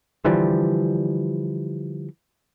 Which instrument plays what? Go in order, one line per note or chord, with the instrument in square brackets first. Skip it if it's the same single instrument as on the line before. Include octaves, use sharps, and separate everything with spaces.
[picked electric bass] D3 E3 F3 G3